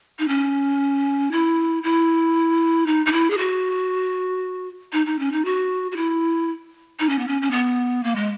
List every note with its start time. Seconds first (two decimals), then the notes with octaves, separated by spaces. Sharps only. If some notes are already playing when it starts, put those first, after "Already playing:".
0.19 D#4
0.28 C#4
1.32 E4
1.83 E4
2.87 D#4
3.06 D#4
3.13 E4
3.31 G#4
3.38 F#4
4.93 D#4
5.06 D#4
5.19 C#4
5.32 D#4
5.45 F#4
5.92 F#4
5.97 E4
7.00 D#4
7.09 C#4
7.19 B3
7.28 C#4
7.42 C#4
7.51 B3
8.04 A#3
8.16 G#3